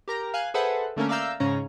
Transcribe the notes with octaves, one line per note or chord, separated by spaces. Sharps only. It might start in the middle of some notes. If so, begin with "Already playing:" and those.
G4 A#4 A#5
F5 G#5 F#6
G#4 A4 B4 C5 E5 F#5
D3 A3 A#3 C#4 A#4
D5 E5 F5 A#5 E6 G6
G#2 C#3 C#4 C#5 A#5